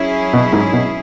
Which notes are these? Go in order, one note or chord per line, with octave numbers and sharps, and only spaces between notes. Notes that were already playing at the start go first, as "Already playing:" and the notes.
Already playing: F#3 C#4 E4 G#4
B2
G#2
B2